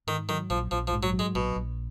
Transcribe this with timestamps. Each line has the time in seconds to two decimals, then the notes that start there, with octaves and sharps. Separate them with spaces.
0.07 G#2 D#3
0.28 D#3 F#3
0.50 A#1 F3
0.71 A#1 F3
0.87 F3
0.93 G#2
1.03 F#3
1.13 F#3
1.19 G#3
1.35 A#1 B2
1.56 A#1